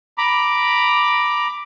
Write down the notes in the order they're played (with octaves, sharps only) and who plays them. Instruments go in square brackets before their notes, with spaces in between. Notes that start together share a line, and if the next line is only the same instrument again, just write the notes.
[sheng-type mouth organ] A#5 B5 D6